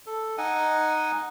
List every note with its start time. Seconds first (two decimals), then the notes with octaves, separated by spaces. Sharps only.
0.07 A4
0.38 D#4 D#5 F#5 G#5